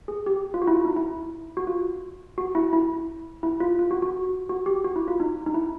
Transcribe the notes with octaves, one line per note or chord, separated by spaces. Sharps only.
G#4
G4
F4
F#4
E4
F4
D#4
E4
F#4
F4
F#4
E4
E4
E4
F4
F4
F#4
F#4
F#4
G4
F#4
E4
F4
D#4
D#4
E4